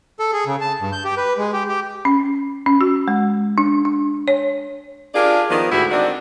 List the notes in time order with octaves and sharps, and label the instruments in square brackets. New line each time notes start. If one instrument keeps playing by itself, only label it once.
[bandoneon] A4
G#4
C#3
A5
G2
G6
G4
B4
G#3
G4
G4
[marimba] C#4
C#4
F#4
G#3
D4
D4
C#5
[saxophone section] D4 F4 G4 G#4 A#4 D5
D#3 F3 B3
D2 G#2 E4 F#4 G4
D#3 C4 D4 F#4 D5